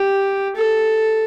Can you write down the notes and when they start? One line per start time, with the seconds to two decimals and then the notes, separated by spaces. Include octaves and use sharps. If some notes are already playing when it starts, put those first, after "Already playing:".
Already playing: G4
0.56 A4